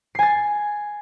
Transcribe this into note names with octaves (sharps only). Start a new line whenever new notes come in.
G#5 A6 C7